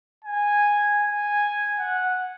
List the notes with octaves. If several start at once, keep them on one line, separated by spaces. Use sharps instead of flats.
G#5
G#5
F#5